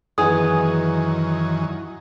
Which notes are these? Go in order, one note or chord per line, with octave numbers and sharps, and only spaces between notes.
F#2 D#3 E3 B3 E4 G#4 G#5 D#6